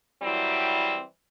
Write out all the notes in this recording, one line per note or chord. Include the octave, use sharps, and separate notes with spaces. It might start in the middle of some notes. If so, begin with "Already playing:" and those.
E3 F#3 G3 C4 E4